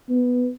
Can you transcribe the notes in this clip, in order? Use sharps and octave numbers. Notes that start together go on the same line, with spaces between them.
B3